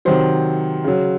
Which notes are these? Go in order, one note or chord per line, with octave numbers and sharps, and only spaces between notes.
C3 D#3 F#3 C5
C#3 F#3